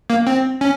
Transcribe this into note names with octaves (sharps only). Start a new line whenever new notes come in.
A#3
C4
C#4